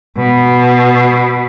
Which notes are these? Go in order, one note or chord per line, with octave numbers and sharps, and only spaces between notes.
B2